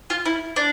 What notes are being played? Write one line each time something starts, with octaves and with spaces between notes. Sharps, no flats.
F4
E4
D4